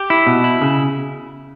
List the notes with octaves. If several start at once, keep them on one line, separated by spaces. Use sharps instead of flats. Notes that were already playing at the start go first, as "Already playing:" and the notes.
Already playing: G4
E4
B2
E4
C#3